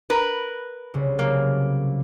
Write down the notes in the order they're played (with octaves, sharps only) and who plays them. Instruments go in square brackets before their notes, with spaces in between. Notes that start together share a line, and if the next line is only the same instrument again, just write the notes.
[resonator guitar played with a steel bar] A#4 B4
[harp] C2 C#3
[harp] F#3 [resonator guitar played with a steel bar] A#3